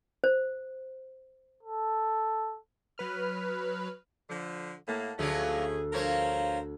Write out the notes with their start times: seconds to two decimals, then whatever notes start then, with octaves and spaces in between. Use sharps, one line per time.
0.24 C5
1.63 A4
2.98 F#3 B4 F6
4.30 D3 F3
4.88 A2 A#3 F#5 A5
5.19 D2 F3 F#3 A3 C#4 D4 G#4
5.93 G2 F3 A#4 C5 C#5 G#6 A#6